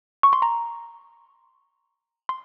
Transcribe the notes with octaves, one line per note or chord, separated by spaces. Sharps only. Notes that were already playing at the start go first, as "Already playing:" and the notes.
C#6
C6
A#5
C6